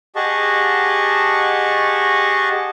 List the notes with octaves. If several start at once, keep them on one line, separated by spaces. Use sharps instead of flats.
G4 G#4 D#5 F#5 A5 C#6